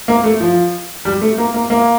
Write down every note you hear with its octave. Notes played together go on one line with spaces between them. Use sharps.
A#3
A3
F3
G3
A3
A#3
A#3
A#3